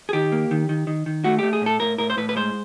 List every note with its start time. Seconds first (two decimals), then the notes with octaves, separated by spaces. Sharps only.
0.09 G#4
0.13 D#3 G4
0.32 A#3
0.51 D#3
0.69 D#3
0.87 D#3
1.06 D#3
1.24 A3 F#4
1.39 A3 G4
1.53 G#4
1.62 A2 A4
1.80 A2 A#4
1.98 A2 A#4
2.10 C5
2.17 A2 B4
2.29 B4
2.36 G#3 C5